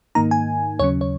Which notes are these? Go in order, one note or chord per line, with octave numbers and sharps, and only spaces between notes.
G#2 D#3 A#3 D#4 A#5
G#5
D#2 C#3 F#3 C#4 C#5
C#5